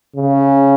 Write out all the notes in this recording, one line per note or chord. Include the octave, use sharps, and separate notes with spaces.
C#3